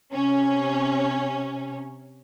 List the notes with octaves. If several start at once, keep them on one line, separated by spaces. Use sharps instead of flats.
C3 C#4